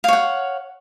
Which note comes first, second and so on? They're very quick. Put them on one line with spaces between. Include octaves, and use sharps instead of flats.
F5 C#5 F#5